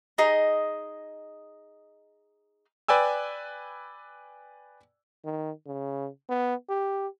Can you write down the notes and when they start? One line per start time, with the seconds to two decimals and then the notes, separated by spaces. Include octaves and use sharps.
0.18 D#4 G#4 D#5 A#5
2.88 B4 D5 G5 G#5 E6
5.25 D#3
5.67 C#3
6.29 B3
6.69 G4